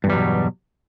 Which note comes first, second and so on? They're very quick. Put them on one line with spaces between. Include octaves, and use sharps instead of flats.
G2 E2 G3 F#3 B2